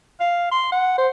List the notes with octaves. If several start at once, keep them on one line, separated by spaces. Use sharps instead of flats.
F5
C6
F#5
C5